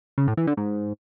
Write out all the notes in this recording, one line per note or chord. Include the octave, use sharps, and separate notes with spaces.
C#3
A2
E3
D3
G#2